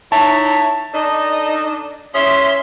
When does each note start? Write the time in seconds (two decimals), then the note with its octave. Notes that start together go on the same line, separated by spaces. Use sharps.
0.12 D#4 E4 C#5 E5 A5
0.94 D4 D#4 A4 D#5
2.14 C#4 E4 G#4 E5 C6